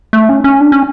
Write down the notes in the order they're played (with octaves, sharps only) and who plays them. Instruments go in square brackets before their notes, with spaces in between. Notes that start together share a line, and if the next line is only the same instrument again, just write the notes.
[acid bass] A3
C#4
C#4
D4
C#4